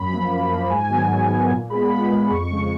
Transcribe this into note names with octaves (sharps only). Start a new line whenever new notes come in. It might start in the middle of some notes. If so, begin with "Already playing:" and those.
Already playing: F#2 B5
F3 A#3
F#2
F3 A#3
G#2 G#5
D#3 F#3 B3
G#2
D#3 F#3 B3
A#2
G#3 B3 B5
A#2
G#3 B3
F2 C#6
C#3 G#3